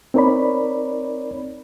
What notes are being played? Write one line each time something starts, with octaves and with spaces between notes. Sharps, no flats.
C4 D#4 A#4 C#5 D5 B5